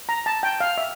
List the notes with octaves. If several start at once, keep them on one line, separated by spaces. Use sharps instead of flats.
A#5
A5
G5
F5
E5